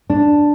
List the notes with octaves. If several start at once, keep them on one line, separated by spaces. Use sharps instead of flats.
D4